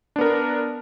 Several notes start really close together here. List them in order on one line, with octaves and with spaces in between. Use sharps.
D4 B3 A#4